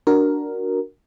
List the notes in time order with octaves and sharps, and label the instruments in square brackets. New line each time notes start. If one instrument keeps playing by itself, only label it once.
[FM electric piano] D4 F#4 A#4